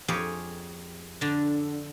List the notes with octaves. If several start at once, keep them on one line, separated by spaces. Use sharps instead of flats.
F2 G4 G#4 C#5 F5
D3 D4